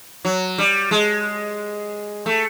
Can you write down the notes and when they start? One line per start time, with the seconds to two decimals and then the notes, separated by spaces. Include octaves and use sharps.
0.25 F#3
0.58 G3
0.91 G#3
2.26 A3